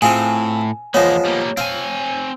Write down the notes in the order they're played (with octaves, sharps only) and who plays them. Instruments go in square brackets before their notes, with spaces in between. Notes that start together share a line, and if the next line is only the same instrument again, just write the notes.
[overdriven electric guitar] A2 [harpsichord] C4 F4 G#4 [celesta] G#5
[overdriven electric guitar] E2 A#3 [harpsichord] F3 G#3 B3 [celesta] C#5
[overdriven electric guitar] G3 A#3
[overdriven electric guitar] C4 G#5 [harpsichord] F5